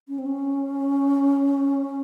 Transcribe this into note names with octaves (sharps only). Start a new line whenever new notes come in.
C#4
C4
C#4